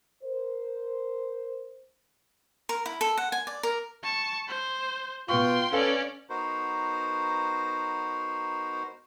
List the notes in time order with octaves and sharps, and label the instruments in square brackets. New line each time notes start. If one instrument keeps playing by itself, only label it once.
[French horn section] A#4 C5
[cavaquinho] A#4
E4
A4
F#5
G#5
D5
A#4
[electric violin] A5 C#6
C5
[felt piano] B2 B3 C#6 [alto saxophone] F4 [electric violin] G5 C6
[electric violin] C#4 D5 [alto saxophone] A4 [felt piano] B4 F5 G#5
[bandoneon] B3 D#4 F#4 A#4 C5